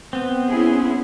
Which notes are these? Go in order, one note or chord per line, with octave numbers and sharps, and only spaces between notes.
B3 C4
C#4 E4 G#4